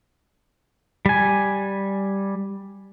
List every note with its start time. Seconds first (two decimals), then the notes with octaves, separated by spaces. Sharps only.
1.06 G3 G#5